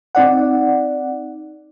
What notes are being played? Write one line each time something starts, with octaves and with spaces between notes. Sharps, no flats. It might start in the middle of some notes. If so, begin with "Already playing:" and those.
C4 D#4 D5 F#5